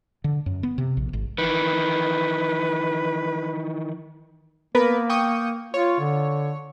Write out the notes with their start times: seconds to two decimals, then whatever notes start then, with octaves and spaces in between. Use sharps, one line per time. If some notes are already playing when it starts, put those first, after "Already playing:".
0.24 D3
0.46 F#2
0.63 B3
0.78 C3
0.97 A#1
1.13 G#1
1.38 D#3 E3 B4
4.75 A#3 B3 A#4 B4
5.09 G5 C#6 D#6
5.74 F4 C#5
6.00 D3